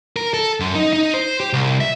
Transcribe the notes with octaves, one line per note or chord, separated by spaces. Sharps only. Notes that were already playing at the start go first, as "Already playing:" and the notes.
A#4
A4
F#2
D#4
D#4
C5
G4
C2
E5